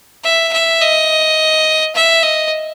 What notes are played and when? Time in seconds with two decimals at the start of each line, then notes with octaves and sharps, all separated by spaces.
0.24 E5
0.53 E5
0.82 D#5
1.96 E5
2.23 D#5